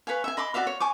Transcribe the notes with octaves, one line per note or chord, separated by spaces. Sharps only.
B4 C#5 F5 G#5
E5 G#5
D#5 B5 C6 D6
F#4 D5 E5 F5
C#5
G#5 C#6 D6